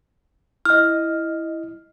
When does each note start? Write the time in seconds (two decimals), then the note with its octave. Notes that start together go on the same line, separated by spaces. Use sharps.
0.65 E4 D#5 F6